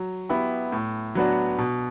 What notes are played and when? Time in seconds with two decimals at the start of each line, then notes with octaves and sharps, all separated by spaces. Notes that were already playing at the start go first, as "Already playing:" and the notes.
Already playing: F#3
0.29 B3 E4 G4
0.72 A2
1.15 F#3 B3 D4 F#4
1.58 B2